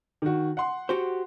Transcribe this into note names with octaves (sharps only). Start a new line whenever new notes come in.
D#3 F#4
F#5 C6
F#4 G4 C5